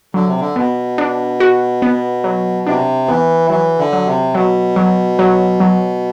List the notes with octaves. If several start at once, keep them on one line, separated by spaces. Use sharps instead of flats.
D3 F#3
C3
D3
B2 B3
D4
F#4
B3
F#3
C3 D4
E3 B3
E3 F#3
D3
F#3
C3
B2 F#3
F#3
F#3
F#3